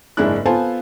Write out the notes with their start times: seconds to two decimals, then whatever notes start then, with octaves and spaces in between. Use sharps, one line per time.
0.17 F#1 G#2 G#3 D4 E4 F#6
0.46 B3 F4 A4 C5 G#5 A5